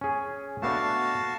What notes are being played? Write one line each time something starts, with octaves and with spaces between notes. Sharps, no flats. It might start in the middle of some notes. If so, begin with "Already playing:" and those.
C#4 G#4
A3 B3 D4 F#4 F5 A5